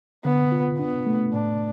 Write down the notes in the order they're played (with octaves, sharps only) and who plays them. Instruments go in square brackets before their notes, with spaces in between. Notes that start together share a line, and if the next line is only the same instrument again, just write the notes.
[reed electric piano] D3 [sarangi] B3
[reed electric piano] F4
[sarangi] B3 [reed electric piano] D4
[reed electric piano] A3
[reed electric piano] A2 [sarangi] D4